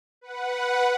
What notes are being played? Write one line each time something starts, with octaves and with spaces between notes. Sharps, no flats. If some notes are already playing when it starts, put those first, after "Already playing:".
B4 F#5